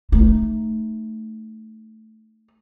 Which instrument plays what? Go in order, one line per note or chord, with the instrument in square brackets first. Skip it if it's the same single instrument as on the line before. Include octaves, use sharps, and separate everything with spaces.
[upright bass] A3 D#4